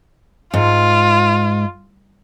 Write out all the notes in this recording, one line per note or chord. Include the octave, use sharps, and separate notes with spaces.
G#2 F4